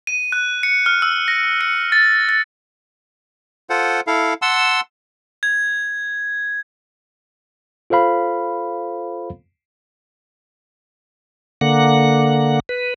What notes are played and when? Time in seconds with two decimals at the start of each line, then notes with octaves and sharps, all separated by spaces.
0.07 D#7
0.32 F#6
0.63 C#7
0.86 F6
1.02 E6
1.28 A#6
1.61 C#7
1.92 A6
2.29 A6
3.70 F4 A4 C5 F#5
4.07 E4 A4 F5
4.42 F#5 A5 C6 E6
5.43 G#6
7.90 F4 A4 C5 F5 B5
11.61 D3 A#3 F#5
12.69 B4